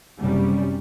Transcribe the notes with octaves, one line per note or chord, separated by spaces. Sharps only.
F#1 C3 G3 C#4